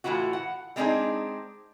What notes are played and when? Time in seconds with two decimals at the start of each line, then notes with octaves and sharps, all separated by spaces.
0.04 A2 C3 E3 F4 F#4
0.33 F#5
0.76 G3 G#3 C4 D4 D#4 G#4